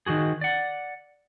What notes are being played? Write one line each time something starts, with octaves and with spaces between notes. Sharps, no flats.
D#3 F3 F#4 G#4
D5 F#5